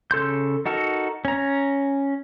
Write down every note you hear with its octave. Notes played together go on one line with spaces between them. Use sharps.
C#3 A4 C6 G6
D#4 F#4 A4 A#4
C#4 A#5